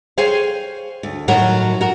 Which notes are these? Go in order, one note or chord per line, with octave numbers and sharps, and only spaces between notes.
G#4 C5 C#5 F5 G5 G#5
D2
A2 D#3 F#3 F#4 A#4
F#4 A#4